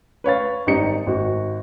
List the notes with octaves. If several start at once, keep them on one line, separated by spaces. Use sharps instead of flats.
B4 C#5 F5 A6
G#1 G3 D#4 C#7
G#1 F#4